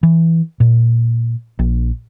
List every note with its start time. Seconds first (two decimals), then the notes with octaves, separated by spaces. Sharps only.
0.03 E3
0.60 A#2
1.59 A#1